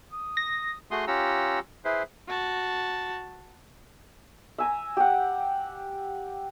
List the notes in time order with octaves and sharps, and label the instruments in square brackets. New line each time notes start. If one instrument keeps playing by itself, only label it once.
[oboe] D#6
[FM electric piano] A#6
[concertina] A3 F#4 G#4 C6 D#6
C#4 F4 G4 F#5 A#5 E6
E4 G#4 B4 C5
[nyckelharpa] F#4 A5
[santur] E5 G#5 A#5
G4 F#5